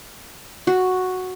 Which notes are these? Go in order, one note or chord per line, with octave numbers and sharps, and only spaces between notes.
F#4